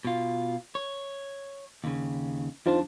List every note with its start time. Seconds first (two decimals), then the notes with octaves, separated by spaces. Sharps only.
0.05 B2 F4
0.75 C#5
1.84 D#2 C#3
2.66 F2 D4 D#4 F4 C5 A5